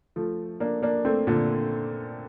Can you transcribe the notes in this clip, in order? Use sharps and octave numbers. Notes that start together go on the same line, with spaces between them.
F3 A3
A#3 D4
A#3 D4
A3 C4
A#2 D3